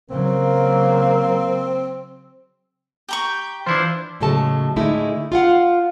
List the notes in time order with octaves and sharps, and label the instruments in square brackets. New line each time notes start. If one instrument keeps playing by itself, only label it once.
[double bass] C#3 F#3 [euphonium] A#3 [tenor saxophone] C4
[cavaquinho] G4 A#5 C#6 [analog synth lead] G6
[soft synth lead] E3 [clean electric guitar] D4 E4 F4 [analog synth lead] C5
[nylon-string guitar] A2 C#3 F#3 G#3 A4 A5
A2 D3 G#3 A3 D#4 E4
F4 F5 F#5